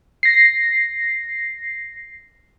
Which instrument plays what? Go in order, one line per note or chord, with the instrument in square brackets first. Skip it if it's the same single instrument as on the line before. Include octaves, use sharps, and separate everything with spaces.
[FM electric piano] A#6 C7